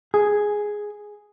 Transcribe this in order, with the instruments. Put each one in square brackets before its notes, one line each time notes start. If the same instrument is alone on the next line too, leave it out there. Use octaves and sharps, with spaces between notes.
[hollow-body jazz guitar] G#4